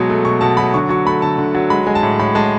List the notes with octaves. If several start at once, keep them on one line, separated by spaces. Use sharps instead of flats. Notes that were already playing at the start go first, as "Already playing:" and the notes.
Already playing: B2 F#3 G#3
A3
B2 C#6
B2 A5
F#3 B5
D3 C#6
F#3 C#6
A3 B5
D3 A5
D3
F#3
G#3 B5
G#3 G#5
A5
A2
A2 B5
G#3 A5